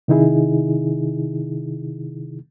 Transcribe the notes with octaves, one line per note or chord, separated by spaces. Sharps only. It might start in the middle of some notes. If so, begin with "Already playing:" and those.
C3 D#3 D#4 E4 G#4